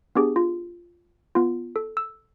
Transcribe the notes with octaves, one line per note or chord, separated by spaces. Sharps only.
B3 D4 G4 G#4
F4
B3 F4
A4
E6